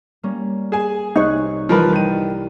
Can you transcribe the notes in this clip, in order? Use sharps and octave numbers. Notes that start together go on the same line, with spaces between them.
G3 A#3 C#4
G#4 G#5 E7
C2 D#4 C#5 F#6
E3 F3 G3 G4 A#4 B4
D#3 D#7